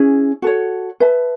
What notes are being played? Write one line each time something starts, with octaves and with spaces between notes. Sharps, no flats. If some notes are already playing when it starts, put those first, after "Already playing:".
Already playing: C#4 E4 G#4
F#4 A4 C#5
B4 E5 A5